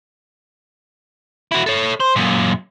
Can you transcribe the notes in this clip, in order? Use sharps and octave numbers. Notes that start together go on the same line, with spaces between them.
E4 F#4
A4 C#5
C5
F#2 A#2